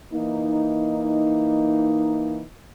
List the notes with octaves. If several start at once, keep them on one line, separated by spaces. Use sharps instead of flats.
E3 A#3 D#4